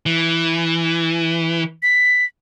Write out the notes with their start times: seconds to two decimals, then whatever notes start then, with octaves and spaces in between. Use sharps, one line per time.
0.06 E3
1.83 B6